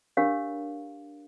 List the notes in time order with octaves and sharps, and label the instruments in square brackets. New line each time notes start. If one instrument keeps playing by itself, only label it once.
[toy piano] D4 G4 A#4 C#5 F5